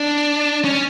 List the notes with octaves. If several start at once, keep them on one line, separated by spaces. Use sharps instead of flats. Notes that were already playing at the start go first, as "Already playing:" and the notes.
Already playing: D4
C#4